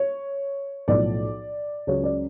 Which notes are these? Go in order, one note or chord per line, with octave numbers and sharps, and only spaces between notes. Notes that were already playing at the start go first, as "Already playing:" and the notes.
Already playing: C#5
B1 A2 F3 D5
C#2 C#3 F#3 C#5
D5